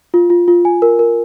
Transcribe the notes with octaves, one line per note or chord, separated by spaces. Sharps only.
F4
F4
F4
G#5
A#4
A#4